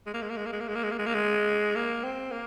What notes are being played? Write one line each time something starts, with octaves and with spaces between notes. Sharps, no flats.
G#3
A#3
G#3
A#3
G#3
A#3
G#3
A#3
G#3
A#3
G#3
A#3
G#3
A#3
G#3
A#3
C4
A#3